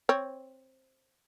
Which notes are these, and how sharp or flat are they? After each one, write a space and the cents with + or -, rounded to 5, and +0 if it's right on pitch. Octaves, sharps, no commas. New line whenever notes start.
C4 +10 C#5 +0